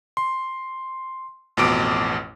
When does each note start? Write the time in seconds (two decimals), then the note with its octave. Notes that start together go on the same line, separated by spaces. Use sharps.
0.17 C6
1.57 A1 F2 B2 D6 D7